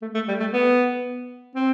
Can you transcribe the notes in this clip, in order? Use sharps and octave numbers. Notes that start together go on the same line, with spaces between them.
A3
A3
G3
A3
B3
C4